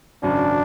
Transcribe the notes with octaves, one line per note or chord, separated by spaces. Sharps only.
G#1 F#2 C#3 D4